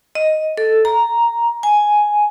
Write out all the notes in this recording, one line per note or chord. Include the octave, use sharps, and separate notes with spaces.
D#5
A4
A#5
G#5